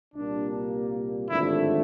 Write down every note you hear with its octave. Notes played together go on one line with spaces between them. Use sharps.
C2 A#2 G3 A#3 D4
G#1 G2 D3 F3 A3 E4